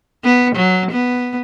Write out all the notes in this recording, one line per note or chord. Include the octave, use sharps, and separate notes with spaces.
B3
F#3
B3